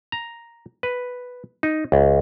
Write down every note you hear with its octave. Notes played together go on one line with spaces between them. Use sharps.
A#5
B4
D#4
C#2